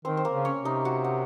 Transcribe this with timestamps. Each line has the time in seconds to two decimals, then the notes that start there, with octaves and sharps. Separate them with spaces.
0.05 D#3 C4 C5
0.17 C5
0.25 A#3 A#4
0.32 C#3
0.45 C#4 C#5
0.59 C3
0.65 D#4 D#5
0.85 F#4 F#5
1.04 F#5